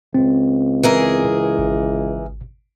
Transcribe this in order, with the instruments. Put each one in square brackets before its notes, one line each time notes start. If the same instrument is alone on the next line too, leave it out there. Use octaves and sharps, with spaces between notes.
[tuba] C#2 [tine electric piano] C4
[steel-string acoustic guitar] E3 G#4 A#4
[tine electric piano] G#1